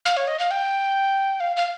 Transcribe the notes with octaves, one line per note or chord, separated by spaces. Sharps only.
F5
C#5
D#5
F5
G5
F5
F5